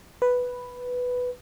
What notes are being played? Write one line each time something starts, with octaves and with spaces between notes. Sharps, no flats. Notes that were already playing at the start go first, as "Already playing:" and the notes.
B4